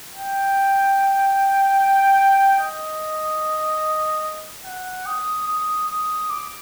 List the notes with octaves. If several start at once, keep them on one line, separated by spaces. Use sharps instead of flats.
G5
D#5
F#5
D#6
D#6
D#6
D6